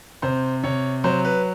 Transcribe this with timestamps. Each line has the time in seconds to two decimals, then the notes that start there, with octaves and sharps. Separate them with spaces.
0.22 C3 C5
0.63 C3 C#5
1.04 F#3 C5
1.25 B4